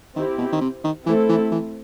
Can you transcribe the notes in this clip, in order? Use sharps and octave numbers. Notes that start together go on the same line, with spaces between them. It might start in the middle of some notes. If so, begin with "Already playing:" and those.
D#3 C4 E4 G4
B2
D#3
C3
D#3
E3 A3 C4 E4 A4
E3
E3